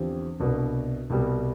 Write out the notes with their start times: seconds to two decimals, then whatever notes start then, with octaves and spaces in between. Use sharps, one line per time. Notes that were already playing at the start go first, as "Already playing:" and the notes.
Already playing: E2 D3 F3 C4 G4
0.40 C2 B2 B3 D4
1.10 C2 B2 G3